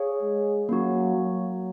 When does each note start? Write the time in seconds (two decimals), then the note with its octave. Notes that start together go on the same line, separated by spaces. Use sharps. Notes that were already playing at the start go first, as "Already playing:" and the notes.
Already playing: G#4 C#5 F5
0.22 G#3
0.69 F#3 A#3 C#4 F#4
1.16 F#3